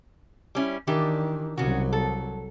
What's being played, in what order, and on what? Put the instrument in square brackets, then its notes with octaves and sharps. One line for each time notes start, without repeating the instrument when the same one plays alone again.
[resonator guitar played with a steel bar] G3 C#4 E4
[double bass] D#3 [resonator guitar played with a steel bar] E3 D4 G4
[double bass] C2 F#3 [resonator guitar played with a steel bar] C#3 C#4 F#4
[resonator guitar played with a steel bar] A4